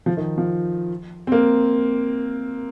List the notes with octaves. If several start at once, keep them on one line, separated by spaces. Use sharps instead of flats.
F3
D#3
F3
C4
A#3